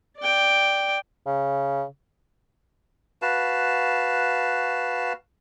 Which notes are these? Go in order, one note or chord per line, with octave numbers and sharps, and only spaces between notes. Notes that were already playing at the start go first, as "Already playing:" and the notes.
D5 G5
C#3
F#4 B4 F5 A5